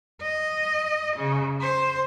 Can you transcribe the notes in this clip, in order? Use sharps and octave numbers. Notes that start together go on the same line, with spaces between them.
D#5
C#3
C5